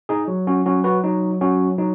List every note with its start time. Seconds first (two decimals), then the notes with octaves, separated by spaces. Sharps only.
0.09 D#4 G#4
0.28 F#3
0.47 C#4 F#4
0.66 F#3 C#4 F#4
0.84 F#4 B4
1.04 F#3 D#4
1.41 F#3 C#4 F#4
1.78 F#3 D#4